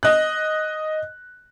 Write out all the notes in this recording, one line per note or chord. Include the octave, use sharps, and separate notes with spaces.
D#5 F#6